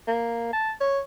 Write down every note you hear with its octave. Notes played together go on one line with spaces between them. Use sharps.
A#3
A5
C#5